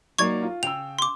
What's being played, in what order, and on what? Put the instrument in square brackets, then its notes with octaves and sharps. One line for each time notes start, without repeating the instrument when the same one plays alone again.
[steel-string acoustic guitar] F#3 A#3 [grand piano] D#4 D5 [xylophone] C#6 G#6
[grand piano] F4
[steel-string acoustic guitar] C#3 [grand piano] G5 E6 [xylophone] F7
[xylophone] C6 D6